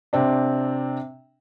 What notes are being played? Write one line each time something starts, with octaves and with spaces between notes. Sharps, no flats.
C3 C4 D4